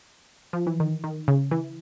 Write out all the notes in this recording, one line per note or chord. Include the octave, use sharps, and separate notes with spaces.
F3
E3
D#3
D#3
C#3
E3